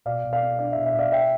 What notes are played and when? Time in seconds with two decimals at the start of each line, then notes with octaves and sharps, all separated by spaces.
0.05 B2 D5 F5
0.24 B2
0.33 D5 F5
0.42 B3
0.59 D4 D5
0.72 B2 E5
0.86 E5
0.94 B2 D5 F5
1.12 E5 G5